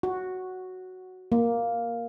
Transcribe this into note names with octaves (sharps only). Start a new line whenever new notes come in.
F#4
A#3